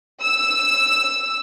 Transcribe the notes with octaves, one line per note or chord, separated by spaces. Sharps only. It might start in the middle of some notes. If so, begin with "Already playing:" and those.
E6